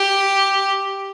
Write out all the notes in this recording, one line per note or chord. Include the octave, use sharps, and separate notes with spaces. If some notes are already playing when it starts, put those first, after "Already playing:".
Already playing: G4